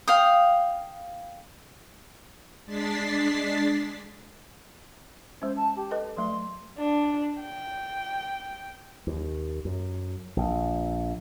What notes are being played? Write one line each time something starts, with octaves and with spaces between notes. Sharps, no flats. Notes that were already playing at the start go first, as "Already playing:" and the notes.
F5 G5 D#6
G#3 D4 A6 B6 C7
G#3 C#4 C5
A5
G4
A4 B4 D#5
F#3 A3 C6
D4
G5
D#2
F#2
A#1